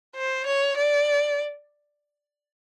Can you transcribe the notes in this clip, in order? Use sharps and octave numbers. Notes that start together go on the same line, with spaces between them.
C5
C#5
D5